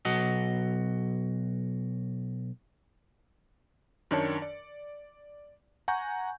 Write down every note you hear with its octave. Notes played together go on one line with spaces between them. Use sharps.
B1 F#4 D#5
F#2 D#3 D4 C#5 A5 C#7
D5
F#5 G#5 A#5 C#6 G6